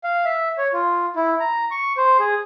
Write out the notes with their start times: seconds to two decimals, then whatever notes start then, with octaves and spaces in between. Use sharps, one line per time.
0.04 F5
0.25 E5
0.58 C#5
0.73 F4
1.16 E4
1.40 A#5
1.71 C#6
1.97 C5
2.19 G#4